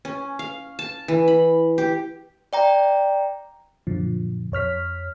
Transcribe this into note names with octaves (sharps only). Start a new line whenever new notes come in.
C#4
F5
A5
E3
B5
G4
D5 G5 A#5
F#2 A#2 D3 F3
F2 C#5 F6 B6